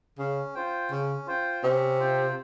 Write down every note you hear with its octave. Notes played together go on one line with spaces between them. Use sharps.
C#3 C#4
F4 C5 G5
C#3 C#4
F4 C5 G5
C3 C#4
F4 C5 G5